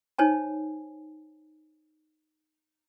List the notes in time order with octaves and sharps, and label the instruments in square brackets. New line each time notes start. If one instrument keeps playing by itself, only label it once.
[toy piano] D#4 C5 C#5 G#5 A5